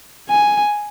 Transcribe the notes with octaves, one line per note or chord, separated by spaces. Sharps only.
G#5